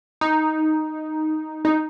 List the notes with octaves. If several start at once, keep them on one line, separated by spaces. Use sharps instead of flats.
D#4
D#4